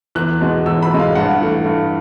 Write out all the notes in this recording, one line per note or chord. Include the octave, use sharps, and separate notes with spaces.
E2 F#6
B2 G#3
E2 E6
B5
B2 G#3
F5
G2 F#5
E3 A3
G2